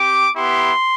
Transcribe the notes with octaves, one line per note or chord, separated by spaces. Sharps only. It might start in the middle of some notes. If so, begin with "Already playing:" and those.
Already playing: C4 G4 D6
B3 E4 G4 C6